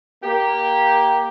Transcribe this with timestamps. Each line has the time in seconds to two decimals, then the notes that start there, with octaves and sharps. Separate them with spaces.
0.23 A#3 G4